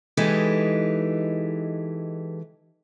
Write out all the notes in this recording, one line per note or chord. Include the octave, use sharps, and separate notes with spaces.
E3 G#3 D#4 G4 A4 B4